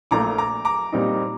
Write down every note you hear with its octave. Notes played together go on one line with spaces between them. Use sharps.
A#1 A#2 A3 A#5 D6
A#5 D6
A#5 D6
A#2 G3 C4 D#4